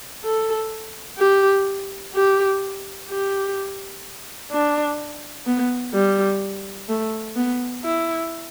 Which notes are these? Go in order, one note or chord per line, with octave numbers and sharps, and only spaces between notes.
A4
G4
G4
G4
D4
B3
G3
A3
B3
E4